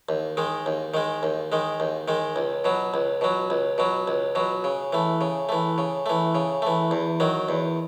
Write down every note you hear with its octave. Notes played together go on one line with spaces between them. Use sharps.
D#2
D#3 G#3
D#2
D#3 G#3
D#2
D#3 G#3
D#2
D#3 G#3
C#2
B2 F#3
C#2
B2 F#3
C#2
B2 F#3
C#2
B2 F#3
C#3
E3 A3
C#3
E3 A3
C#3
E3 A3
C#3
E3 A3
E2
D#3 F#3
E2